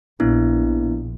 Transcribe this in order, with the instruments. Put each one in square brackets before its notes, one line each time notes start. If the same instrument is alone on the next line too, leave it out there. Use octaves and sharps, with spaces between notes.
[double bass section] A#1 [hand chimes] B3 D4 E4